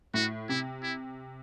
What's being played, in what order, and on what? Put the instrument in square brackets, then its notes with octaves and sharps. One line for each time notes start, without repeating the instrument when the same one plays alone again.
[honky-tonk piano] A2 [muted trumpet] F#4
[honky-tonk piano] C3 [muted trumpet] E4
[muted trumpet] E4